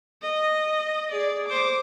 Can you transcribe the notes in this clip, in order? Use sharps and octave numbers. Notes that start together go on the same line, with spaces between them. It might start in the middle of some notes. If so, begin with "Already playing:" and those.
D#5
G#4 D5
C5 D6